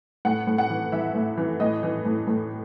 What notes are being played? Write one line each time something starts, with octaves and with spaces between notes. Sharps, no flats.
A2 F#5
A2
F#5
E3
E3 E5
A2
E3
A2 D#5
E3
A2
A2